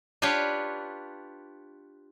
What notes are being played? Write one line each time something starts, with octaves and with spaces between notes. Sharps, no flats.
D4 F4 G4 B4 C#5